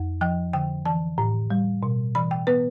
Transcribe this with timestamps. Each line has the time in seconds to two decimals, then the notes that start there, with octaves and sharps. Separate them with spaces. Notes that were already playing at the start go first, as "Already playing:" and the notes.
Already playing: F2
0.21 F3 G5
0.53 D3 G5
0.86 E3 A5
1.18 A2
1.50 G3
1.83 B2
2.15 E3 B5
2.31 G5
2.47 B3 B4